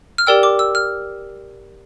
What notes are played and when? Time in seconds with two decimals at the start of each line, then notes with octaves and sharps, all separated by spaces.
0.18 F6
0.27 G4 A#4 D5 G5 E6
0.43 D6
0.59 E6
0.75 F6